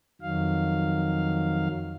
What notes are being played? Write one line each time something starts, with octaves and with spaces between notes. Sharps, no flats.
F2 D#3 F#3 F5